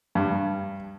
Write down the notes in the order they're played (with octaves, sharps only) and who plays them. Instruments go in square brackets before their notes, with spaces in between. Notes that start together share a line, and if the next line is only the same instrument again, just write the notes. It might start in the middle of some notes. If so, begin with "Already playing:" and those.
[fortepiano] G2